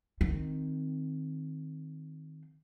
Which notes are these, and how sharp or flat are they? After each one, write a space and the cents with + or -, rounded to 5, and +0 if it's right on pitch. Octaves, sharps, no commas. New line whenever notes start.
D#3 +0 C4 +0